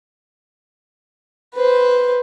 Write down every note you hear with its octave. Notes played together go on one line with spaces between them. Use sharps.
B4 C5